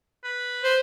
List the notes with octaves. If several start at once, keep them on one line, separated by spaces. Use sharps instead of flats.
B4
C5